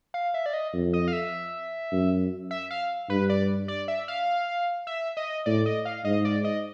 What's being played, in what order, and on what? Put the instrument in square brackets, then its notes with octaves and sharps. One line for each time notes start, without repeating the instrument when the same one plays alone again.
[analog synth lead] F5
E5
D5
D#5
[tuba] F2
[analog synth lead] D#5
F5
E5
[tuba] F#2
[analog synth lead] E5
F5
[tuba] G2 [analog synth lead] B4
[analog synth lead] D5
D5
E5
F5
E5
D#5
[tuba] A2 [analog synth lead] D5
[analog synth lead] D#5
F5
[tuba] G#2 [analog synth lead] D#5
[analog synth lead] D5
D#5